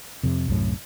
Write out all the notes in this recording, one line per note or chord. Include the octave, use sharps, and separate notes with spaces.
F2 C3
C2 F#2 A2